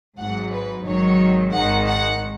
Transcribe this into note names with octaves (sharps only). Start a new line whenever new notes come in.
G#1 G#2 F#3 F#5
B4
G#1 G#2 D#3 F#3 C#5
G#1 G#2 D#3 G#3 F#5
F#5